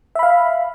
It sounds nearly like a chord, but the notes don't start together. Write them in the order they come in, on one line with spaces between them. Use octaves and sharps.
E5 B5 F5